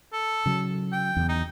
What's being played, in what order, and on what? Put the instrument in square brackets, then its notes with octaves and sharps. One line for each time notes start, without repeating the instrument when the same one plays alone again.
[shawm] A4
[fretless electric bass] C#3 F#3
[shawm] G5
[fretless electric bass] E2
[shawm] D#4